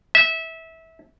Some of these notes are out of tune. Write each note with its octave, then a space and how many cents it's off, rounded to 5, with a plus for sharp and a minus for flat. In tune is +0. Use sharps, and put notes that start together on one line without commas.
E5 -20